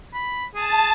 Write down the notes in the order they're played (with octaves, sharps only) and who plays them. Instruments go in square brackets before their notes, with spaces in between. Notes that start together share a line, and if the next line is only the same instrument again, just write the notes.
[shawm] B5
[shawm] G#4 [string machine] A5